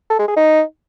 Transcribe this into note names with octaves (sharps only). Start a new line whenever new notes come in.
A4
G#3
G#4
D#4